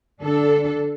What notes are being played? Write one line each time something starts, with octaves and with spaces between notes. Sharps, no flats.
D3 D4 A4